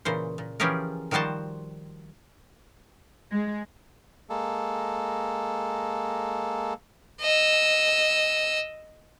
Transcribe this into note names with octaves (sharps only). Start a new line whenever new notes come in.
A#2 C#3 E3 C5
A#2
E3 F3 C#4 G4 G#4 A#4
D#3 F3 G3 F#4 C5 A5
G#3
G#3 A#3 A4
D#5 E6